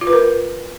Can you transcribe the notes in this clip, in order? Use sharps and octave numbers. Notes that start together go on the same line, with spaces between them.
F4
B4
A#4